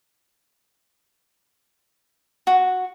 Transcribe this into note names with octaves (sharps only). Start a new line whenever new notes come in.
F#4